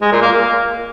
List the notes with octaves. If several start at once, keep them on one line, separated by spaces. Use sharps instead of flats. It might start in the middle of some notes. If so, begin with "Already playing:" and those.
G#3
A#2
A#3
A#3